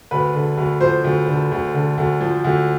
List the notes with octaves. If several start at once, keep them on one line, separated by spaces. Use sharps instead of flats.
D2 B4
D3
D2
F3 C5
D2
D3
D2
D3
D2
F3
D2